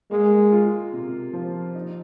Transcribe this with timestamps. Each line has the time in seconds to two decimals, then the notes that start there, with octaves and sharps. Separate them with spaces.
0.11 G#3 A#3
0.52 F4
0.93 C3
1.33 F3
1.75 D#4